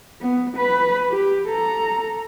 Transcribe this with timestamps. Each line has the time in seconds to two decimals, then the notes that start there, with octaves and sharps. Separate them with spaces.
0.21 B3
0.57 B4 B5
1.09 G4
1.48 A4 A#5